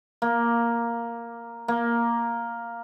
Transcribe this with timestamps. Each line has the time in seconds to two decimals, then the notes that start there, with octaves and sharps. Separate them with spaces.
0.22 A#3
1.68 A#3